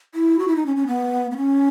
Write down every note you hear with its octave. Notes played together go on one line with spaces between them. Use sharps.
E4
F#4
E4
D#4
C#4
C#4
B3
B3
C#4